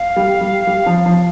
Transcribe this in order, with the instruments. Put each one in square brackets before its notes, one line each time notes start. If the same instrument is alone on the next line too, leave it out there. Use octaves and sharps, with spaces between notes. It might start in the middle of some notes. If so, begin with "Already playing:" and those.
Already playing: [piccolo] F5
[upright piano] G3
G3
G3
F3
F3